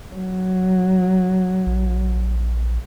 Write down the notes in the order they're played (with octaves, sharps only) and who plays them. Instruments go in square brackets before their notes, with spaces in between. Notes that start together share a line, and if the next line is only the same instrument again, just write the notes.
[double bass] F#3
[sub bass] A#1